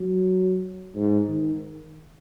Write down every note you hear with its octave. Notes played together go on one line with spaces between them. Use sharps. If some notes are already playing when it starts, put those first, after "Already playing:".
Already playing: F#3
G#2
D#3